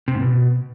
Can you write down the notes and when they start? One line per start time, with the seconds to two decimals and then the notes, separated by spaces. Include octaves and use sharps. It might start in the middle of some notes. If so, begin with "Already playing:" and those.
0.08 C3
0.15 G#2
0.22 B2